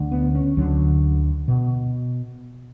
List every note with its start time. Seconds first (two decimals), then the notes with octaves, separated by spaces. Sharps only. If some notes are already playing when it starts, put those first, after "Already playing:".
Already playing: D2 D3
0.11 B3
0.35 C#4
0.57 D2 D3 F#3
1.48 B2